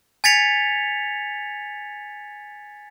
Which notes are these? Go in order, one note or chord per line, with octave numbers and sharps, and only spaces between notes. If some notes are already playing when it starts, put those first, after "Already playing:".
G#5 G#6 A6 B6 C#7 F7